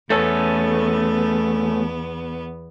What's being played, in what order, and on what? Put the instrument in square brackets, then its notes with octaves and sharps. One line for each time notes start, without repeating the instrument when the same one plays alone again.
[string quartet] E2 B3 [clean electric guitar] A3 C#4 A4